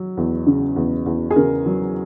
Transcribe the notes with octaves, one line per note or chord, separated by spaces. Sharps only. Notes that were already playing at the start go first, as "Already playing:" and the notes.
Already playing: F#3
E2
C#3
E2
E2
G#4
C#3 A#4
F#3